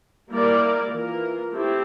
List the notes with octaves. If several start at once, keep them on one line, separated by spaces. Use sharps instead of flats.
G3 A#3 E4 A#4 D5
E3 A#3 F4 A#4
A3 C4 E4 G4